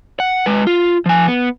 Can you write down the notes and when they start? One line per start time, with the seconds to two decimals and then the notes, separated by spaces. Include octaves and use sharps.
0.20 F#5
0.46 G#3 B4
0.67 F4
1.06 F3 G#5
1.28 B3